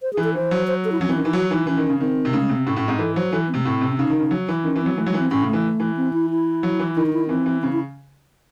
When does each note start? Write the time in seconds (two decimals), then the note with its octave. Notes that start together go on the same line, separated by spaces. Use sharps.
0.02 C5
0.13 E3 G#4
0.24 A4
0.34 E3 C5
0.51 F#3
0.67 C5
0.85 A4
0.92 E4
1.01 F#3 C#4
1.08 E3 C4
1.16 D#3 C#4
1.25 E3 D#4
1.33 F#3 F#4
1.51 E3 D#4
1.67 E3 C#4
1.77 D#3
1.89 C#3
2.00 D#3 C4
2.25 C3
2.33 C#3 A3
2.41 G#3
2.49 C3 A3
2.57 C4
2.66 A2 C#4
2.76 A2 C#4
2.87 G#2 C4
2.98 E3 A4
3.15 F#3 C5
3.32 E3 A4
3.49 C4
3.54 C3 A3
3.65 A2 C4
3.81 C3
3.89 C#4
3.99 C#3 D#4
4.10 D#3
4.20 C#3
4.31 F#3
4.48 E3
4.64 D#3 C#4
4.76 E3
4.81 F#3 C4
4.97 E3 A3
5.06 F#3 G#3
5.14 E3
5.19 C4
5.31 A2 C#4
5.42 C#3 A3
5.53 E3
5.80 E3
5.97 C4
6.13 E4
6.30 E4
6.63 F#3
6.79 E3
6.95 D#3 E4
7.06 D#4
7.13 E4
7.29 E3 C4
7.46 E3
7.62 C#3 C4
7.72 E4